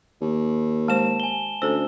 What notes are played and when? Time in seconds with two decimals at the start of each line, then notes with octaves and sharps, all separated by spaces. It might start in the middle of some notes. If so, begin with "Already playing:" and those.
0.21 D#2
0.88 G#3 C5 A5 E7
1.20 G#5 G7
1.62 D2 C#4 A4 C5 E6